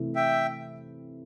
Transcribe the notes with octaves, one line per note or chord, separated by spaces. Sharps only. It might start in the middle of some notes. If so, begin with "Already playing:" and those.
Already playing: C3 E3 A3 E4
E5 G5